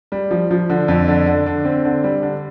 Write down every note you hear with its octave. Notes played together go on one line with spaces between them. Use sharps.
G3
F3
F3
D3
F2
D3
D3
D3
C4
D3
G3
D3